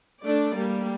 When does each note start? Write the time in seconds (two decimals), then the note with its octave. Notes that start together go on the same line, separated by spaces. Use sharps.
0.24 A3 D4 D5
0.56 G3 A#3